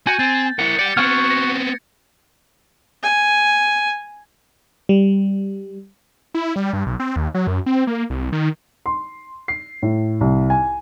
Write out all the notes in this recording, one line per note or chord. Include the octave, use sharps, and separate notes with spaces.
F#4 G#5 G6
C4 A6
E4 A#4 F#5
G4 D5 C#7
B3 C4 F#4 F#5 F6 G#6 C#7
A#6 C#7
G#5
G3
E4
G3
G2
B1
C4
D#2
F#3
F#2
C4
A#3
C2
D#3
C6
C7
A2
C2
G#5